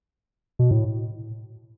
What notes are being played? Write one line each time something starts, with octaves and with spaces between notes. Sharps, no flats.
B2
A2